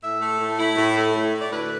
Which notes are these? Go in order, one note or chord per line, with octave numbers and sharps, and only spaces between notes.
A2 E5
A3
A2
E4
A2
A3
A2
E4
D5
D2 B4